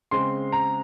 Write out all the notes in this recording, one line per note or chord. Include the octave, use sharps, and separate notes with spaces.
C#3 G#3 C4 C6
A#5